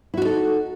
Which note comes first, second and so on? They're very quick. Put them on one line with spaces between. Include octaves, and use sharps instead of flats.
E4 F#4 D#4 A4